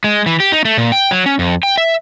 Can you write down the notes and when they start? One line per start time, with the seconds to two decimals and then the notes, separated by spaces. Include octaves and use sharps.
0.04 G#3
0.26 E3
0.40 G4
0.52 D#4
0.65 A3
0.78 A#2
0.92 G5
1.11 F#3
1.26 C#4
1.39 F2
1.63 G5
1.78 E5